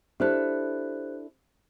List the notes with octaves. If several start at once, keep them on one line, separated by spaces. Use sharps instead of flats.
D4 E4 G4 A4 C5 F#6